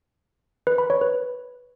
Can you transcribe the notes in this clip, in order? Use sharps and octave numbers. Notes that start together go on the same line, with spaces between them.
B4
B5
C#5
B4